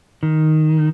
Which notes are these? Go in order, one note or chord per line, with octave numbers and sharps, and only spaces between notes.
D#3